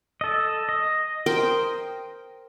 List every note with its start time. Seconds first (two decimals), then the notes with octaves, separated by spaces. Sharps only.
0.21 A4 D#5
0.69 D#5
1.26 A#4 C5 G5